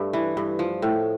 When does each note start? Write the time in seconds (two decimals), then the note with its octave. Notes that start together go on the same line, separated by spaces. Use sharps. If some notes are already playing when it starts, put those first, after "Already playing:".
Already playing: G2 A3
0.13 E3
0.37 G2
0.59 F3
0.82 A2